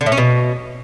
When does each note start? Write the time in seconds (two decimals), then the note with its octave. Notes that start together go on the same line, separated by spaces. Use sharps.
0.01 D3
0.06 A2
0.12 C#4
0.18 B2